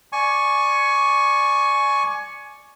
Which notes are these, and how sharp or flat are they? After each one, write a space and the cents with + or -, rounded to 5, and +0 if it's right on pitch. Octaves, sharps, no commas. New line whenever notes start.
D5 +0 G#5 +20 C#6 +0